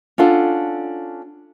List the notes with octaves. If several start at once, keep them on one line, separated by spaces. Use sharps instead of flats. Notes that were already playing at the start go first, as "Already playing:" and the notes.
C#4 D4 F4 A4 F#5